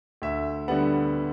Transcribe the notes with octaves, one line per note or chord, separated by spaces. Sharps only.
D2 E5
D3 G3 B3 F#5